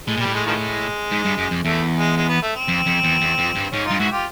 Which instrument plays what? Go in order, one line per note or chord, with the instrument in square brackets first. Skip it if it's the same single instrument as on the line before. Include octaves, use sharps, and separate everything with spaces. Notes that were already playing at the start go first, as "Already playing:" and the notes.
[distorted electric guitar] A2 [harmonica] G#3
[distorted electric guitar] A#2 [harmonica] G3
[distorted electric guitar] A2
[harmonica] G#3
D#3 F3 G#3
[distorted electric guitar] G#2
G2
F#2
F2
[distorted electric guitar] E2 [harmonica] A3
[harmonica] G#3
G#3
B3
A3
C4
[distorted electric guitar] F2
F2
E2
E2
F2
G2
[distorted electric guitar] G#2 [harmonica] C#4
[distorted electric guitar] G2 [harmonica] D#4 F4
[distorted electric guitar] G#2 [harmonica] E4 F#4
[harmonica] F4 G4